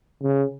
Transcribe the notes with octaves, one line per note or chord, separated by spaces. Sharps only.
C#3